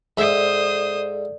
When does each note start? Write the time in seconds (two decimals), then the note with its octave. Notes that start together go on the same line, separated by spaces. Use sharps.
0.18 G#2 A4 C5 D5 E5 D#6